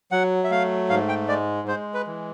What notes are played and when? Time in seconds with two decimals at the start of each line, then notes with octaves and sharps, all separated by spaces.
0.11 F#3 F#5
0.44 E5
0.50 A3 F5
0.89 G#2 F5
1.08 G5
1.28 G#3 D5
1.68 G#3 C5
1.94 B4
2.07 E3